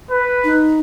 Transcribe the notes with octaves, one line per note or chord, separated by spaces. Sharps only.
B4
D#4